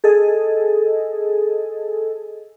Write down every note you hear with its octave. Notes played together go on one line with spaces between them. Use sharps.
G#4 A4 D#5